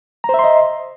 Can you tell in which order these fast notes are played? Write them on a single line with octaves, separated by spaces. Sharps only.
A#5 C5 E5 C6 D#5